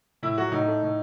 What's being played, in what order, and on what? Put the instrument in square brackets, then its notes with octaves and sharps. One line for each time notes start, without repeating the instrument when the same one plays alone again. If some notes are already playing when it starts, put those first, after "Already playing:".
[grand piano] A2 E4
F#3 F#4
A2 D#4
A3
A2